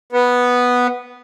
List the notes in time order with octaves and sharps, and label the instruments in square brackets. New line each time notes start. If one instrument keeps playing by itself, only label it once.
[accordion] B3